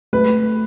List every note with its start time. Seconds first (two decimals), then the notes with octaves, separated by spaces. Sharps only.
0.13 A3 B4